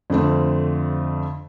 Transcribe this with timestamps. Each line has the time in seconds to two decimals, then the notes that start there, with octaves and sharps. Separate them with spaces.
0.10 F2 D3 A3 C4